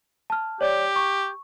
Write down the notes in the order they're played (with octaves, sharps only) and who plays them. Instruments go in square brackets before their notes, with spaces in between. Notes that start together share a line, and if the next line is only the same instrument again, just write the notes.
[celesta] A5 F6
[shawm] G4 [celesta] C#5 D5
[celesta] C#6